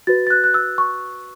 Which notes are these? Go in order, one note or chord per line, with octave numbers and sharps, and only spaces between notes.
F#4 B4 A6
A6
F#6
F#6
E6
C#6